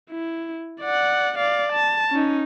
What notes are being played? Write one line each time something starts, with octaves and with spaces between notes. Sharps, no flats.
E4
D5 F#5
D5 F5
A5
C#4 D#4